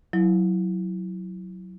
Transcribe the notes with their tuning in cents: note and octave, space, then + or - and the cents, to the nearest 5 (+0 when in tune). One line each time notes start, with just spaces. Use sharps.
F#3 +0 E4 +0